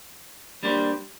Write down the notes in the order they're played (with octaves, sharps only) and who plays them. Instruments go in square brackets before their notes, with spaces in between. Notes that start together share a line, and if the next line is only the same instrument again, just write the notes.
[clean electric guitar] G3 A#3 D4 G4 C5